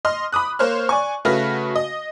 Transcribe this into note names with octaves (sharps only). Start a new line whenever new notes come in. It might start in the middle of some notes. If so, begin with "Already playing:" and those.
D#5 C6 F6
B5 D6 D#6 F#6
A#3 C5 C#5 F6
D5 G#5 C#6
C#3 A3 F#4 B4 F6 A#6
D#5